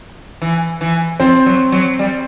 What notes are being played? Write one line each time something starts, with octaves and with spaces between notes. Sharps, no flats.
E3
E3
F3 C4 C5
F#3
F#3
G3